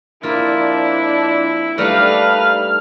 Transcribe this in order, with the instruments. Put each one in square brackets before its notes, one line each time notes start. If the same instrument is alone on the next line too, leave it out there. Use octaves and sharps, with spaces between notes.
[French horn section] F2 F3 D4 [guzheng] A#3 F4 [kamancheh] E4
[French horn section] G3 [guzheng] A3 D4 D#4 [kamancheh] B4 F5 [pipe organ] F6